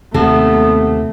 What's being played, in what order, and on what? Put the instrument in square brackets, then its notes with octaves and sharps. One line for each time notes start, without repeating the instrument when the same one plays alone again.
[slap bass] D#2 C3 [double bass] A3 [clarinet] B3 [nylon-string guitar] A4